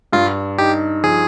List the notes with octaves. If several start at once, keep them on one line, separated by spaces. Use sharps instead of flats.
G2 F4
D#4 G4
F3 G#4